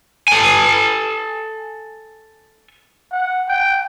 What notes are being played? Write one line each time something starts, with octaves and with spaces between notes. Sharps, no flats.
A4 G#5
F#5
G5